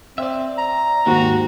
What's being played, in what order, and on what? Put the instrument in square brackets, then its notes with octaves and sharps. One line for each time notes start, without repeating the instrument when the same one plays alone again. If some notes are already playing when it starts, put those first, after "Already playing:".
[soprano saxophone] C4 [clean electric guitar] D5 E5
[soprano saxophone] A#5
[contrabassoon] D#2 [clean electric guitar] G#2 C4 [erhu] F#4